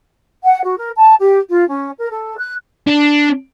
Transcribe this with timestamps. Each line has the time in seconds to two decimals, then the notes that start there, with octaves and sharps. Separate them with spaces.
0.44 F#5
0.64 F#4
0.78 A#4
0.98 A5
1.20 G4
1.50 F4
1.68 C#4
1.99 A#4
2.11 A4
2.38 F#6
2.87 D4